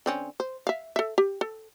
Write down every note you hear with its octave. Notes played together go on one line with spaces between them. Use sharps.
D3 C4 C#4
C5
E5 F5
A4 E5
G4
A4